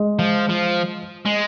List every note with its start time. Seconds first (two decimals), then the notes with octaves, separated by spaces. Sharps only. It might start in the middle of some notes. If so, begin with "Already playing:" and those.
Already playing: G#3
0.19 F3
0.49 F3
1.25 G#3